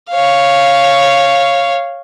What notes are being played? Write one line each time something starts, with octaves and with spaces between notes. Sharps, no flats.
C#5 F5